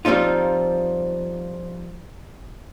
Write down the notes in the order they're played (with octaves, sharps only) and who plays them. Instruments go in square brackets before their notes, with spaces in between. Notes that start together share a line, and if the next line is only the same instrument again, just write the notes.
[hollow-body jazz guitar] F3 G3 C4 D#4 F4